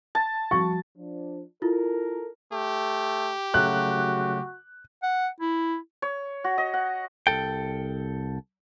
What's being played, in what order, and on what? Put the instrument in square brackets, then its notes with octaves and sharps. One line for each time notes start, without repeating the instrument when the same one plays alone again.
[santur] A5
[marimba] F3 G3 F#4 [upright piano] C#6
[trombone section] F3 D4
[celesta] E4 F4 [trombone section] A4 A#4
[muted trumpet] A3 [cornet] G4
[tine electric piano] C#3 F#3 A3 [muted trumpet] F#4 [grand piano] F#6
[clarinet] F#5
E4
[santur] C#5
F#4
D#5
F#5
[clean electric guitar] C2 G2 A4 G5